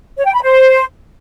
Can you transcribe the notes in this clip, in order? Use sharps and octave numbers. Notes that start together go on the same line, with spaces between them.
C#5
G5
B5
C5